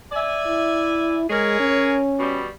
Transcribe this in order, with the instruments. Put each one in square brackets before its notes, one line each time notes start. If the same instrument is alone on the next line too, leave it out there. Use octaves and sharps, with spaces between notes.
[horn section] D5 E5 G#5
[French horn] E4
[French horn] G#3 [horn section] G#4 A#4 C#5
[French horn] C#4
[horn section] B2 G3